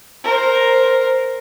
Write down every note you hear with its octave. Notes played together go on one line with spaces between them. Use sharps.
A#4 C5